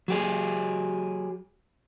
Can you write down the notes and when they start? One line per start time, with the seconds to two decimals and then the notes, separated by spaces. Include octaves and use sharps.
0.08 F#3 G4 G#4